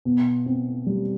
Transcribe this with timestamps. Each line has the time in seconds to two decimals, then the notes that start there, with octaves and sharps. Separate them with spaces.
0.05 B2
0.46 C4
0.87 G3